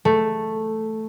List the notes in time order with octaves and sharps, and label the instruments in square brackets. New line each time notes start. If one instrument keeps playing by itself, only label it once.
[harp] A3